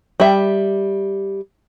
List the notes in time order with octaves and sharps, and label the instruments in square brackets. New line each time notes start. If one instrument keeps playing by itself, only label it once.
[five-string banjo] G3 E5